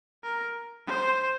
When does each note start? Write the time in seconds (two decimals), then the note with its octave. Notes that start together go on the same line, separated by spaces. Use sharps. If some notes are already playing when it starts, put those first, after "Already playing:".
0.23 A#4
0.87 C5